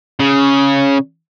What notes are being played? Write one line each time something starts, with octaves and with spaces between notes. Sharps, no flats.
C#3